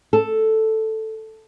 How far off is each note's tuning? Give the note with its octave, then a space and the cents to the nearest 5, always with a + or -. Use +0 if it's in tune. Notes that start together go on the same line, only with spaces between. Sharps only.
A4 +0